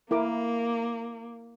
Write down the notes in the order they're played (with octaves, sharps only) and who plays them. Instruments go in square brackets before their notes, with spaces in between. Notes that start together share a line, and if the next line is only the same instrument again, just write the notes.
[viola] A#3 [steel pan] E4 A#4 D6